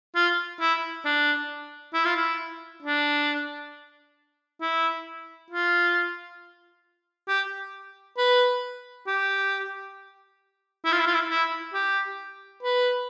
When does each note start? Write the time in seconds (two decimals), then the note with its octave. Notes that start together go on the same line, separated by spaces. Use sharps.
0.15 F4
0.60 E4
1.05 D4
1.94 E4
2.05 F4
2.16 E4
2.83 D4
4.61 E4
5.50 F4
7.28 G4
8.18 B4
9.07 G4
10.85 E4
10.92 F4
10.99 E4
11.07 F4
11.14 E4
11.30 E4
11.74 G4
12.63 B4